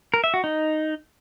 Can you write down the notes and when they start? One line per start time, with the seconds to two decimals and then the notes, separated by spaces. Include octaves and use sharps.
0.14 A#4
0.24 E5
0.34 F#4
0.44 D#4